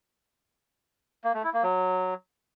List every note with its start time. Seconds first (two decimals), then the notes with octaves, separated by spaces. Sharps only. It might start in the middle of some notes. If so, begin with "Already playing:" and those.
1.24 A#3
1.34 A3
1.44 E4
1.54 A#3
1.63 F#3